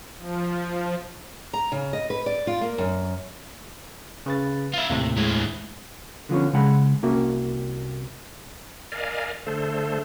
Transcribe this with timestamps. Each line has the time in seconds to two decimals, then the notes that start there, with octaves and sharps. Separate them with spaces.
0.18 F3
1.53 A#5
1.72 C#3
1.93 D#5
2.10 B4
2.26 D5
2.47 F4
2.61 A#3
2.78 F#2
4.26 C#3 B4 A6
4.73 F4 E5
4.90 D#2 A2 C3
5.17 G#3 E4
6.29 D3 F3 B3 C#4
6.53 C#3 G#3 F#5 B5
7.03 C2 A#3 C#4 F#4 E5
8.92 A#4 D5 D#5 F5 G#5
9.47 D3 A3 A4 C5